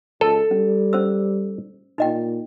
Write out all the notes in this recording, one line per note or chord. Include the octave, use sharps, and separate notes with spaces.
C#2 A4 A5
G3 C#4
C#4 C5 E6
A#2 D#4 D#5 G5